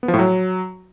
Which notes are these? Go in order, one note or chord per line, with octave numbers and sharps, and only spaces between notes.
B3
F3
A2
F#3